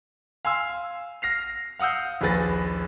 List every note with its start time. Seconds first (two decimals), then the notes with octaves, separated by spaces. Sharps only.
0.45 F5 G#5 C6 E6
1.22 F6 A#6 C7 F7
1.79 F5 F#5 D#6 E6 G6
2.21 A#1 D#2 G#4 B4 A6 A#6